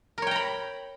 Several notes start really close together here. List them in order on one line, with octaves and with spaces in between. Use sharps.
A#4 C#5 G5 A#5 B5